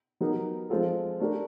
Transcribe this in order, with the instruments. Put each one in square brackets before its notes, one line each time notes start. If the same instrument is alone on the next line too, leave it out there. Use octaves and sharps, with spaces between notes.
[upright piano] F#3 B3 D#4 G4 A#4
F3 G#3 C4 F4 A4
A3 D4 G4 A#4